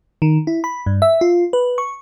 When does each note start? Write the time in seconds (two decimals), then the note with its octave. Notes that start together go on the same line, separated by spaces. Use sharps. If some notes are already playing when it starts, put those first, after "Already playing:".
0.22 D#3
0.47 E4
0.64 B5
0.86 G2
1.02 E5
1.21 F4
1.53 B4
1.78 C#6